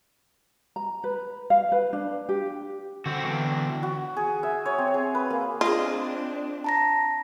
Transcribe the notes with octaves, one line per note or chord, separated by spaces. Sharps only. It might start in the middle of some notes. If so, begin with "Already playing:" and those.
A#5
B4
F5
B4
D4
G4
D3 C4 F#4
B2 E3 G5
F#4
G#4
E5
C#5
C4
G#4
B4
A#3
C4 D4 F4 G#4 D#5
A5 A#5 A#6